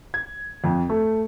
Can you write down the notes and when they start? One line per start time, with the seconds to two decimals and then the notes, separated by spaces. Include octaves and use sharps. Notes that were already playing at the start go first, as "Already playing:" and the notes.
0.14 G#6
0.64 F2
0.90 A3